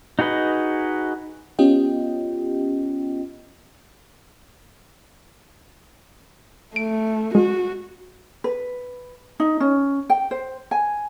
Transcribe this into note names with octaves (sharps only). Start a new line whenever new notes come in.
D#4 F#4 G#4 B4 D#5
B3 C#4 F4 G4 D#5 G5
A3 D7
G#3 F#4
B4
D#4
C#4
G5
C5
G#5